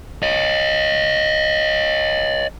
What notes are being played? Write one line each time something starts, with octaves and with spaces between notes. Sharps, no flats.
C#5 D#5